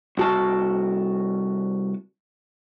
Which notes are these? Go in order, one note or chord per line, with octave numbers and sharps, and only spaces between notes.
C2 F#4 A5